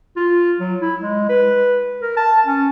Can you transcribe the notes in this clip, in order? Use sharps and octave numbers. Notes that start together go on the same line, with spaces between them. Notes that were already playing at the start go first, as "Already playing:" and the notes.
F4
F#3
E4
G#3
B4
A#4
A5
C#4